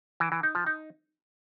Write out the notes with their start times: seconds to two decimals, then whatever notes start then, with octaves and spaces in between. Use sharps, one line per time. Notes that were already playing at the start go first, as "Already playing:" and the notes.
0.20 E3
0.32 E3
0.43 D#4
0.55 F3
0.66 D#4